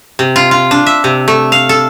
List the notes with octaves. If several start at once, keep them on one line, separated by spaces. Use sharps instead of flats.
C3
F4
F4
D4
E5
C3
A3
F5
A4